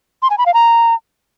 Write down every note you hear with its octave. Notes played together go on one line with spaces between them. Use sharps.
C6
G#5
B5
F5
A#5